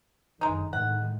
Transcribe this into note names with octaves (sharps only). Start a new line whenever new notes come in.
G1 F#2 D#3 G#3 D#4
A2 D#3 G#3 F#5